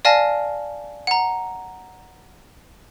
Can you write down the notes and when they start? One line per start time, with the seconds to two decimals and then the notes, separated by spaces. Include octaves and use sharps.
0.05 D5 F5 G#5 A5 F6 A#6
1.07 F#5 A#5